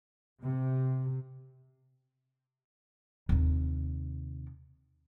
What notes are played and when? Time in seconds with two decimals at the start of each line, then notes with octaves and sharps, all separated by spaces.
0.43 C3
3.29 D#2 C3